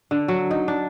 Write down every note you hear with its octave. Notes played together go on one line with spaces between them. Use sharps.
D3
F#3
D#4
D4